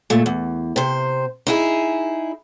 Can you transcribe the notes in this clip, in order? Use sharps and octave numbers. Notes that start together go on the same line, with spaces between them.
A#2 A3
E2
C3 C5
D#4 E4 G#4